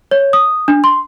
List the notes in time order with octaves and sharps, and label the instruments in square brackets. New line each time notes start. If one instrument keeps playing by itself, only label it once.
[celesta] C#5
D#6
D4
C6